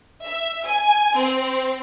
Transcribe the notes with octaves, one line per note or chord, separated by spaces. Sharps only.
E5
G#5
C4